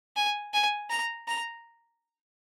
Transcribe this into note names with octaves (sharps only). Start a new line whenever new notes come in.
G#5
G#5
A#5
A#5